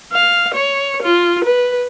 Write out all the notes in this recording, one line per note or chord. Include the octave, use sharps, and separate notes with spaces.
F5
C#5
F4
B4